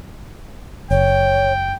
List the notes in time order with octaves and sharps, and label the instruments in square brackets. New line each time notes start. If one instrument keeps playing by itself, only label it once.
[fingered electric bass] F#1 [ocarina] C#5 [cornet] G5